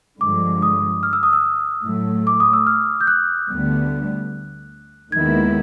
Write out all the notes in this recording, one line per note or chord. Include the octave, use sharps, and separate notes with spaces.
G2 D3 F3 G#3 D6
D#6
F6
E6
D#6
E6
A2 F#3 A3
D6
D#6
E6
F6
G6
F#6
D2 D3 G3 B3
D#2 D#3 G#3 B3 E4 G#6